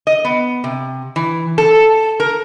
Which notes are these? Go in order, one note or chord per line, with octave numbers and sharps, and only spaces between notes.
D#5
B3
C3
E3
A4
A#4